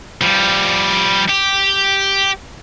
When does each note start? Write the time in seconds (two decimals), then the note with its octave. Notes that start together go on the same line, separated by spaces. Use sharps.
0.21 F3 G3
1.29 G4